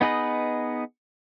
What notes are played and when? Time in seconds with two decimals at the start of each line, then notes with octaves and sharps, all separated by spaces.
0.01 B3 D#4 G#4 B4 D#5